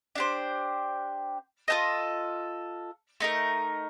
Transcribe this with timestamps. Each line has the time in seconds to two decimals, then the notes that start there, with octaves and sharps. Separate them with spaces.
0.15 D4 G4 C5
1.68 F4 A4 C5 D#5
3.20 A3 D#4 A#4